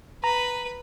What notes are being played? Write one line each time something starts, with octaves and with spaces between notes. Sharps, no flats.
B4 A#5